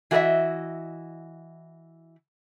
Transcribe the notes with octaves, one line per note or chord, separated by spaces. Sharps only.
E3 F#4 A#4 B4 D#5 E5